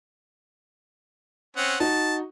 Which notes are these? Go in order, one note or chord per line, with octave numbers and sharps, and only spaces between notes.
C4 C#4 F#5
D#4 F#4 A5